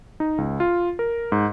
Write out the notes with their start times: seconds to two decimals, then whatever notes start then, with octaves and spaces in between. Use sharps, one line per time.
0.20 D#4
0.38 C#2
0.60 F4
0.99 A#4
1.32 G#2